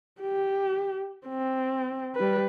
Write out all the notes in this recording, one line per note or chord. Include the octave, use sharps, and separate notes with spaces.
G4
C4
G3 B4